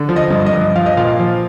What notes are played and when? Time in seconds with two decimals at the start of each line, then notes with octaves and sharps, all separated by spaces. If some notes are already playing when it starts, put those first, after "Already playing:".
Already playing: D3
0.09 F3
0.16 D#5
0.30 G2
0.46 D#5
0.53 G2
0.76 F3 F5
0.86 D#5
0.97 A#2 F5
1.20 F3